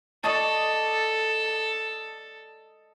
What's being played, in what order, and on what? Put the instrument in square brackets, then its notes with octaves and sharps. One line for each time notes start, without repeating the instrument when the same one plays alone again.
[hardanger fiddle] A4 [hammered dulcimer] D5 D#5 A5